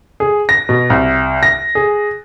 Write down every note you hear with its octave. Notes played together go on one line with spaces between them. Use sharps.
G#4
A#6
B2
C2
A#6
G#4